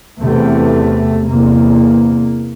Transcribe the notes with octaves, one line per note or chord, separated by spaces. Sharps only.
E2 C3 A3
E2 C3 A#3